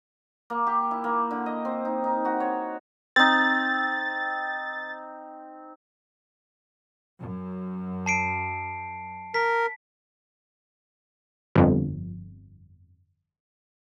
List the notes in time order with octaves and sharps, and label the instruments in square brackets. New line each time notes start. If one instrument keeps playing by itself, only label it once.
[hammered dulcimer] A#3
G4
E4
A#3
D3
D#5
C4
D#4
D#4
F#4
C#5
[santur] C4 D#4 [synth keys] A6
[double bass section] F#2
[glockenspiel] A5 C7 D7
[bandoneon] A#4 [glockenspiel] B6
[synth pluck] G1 F2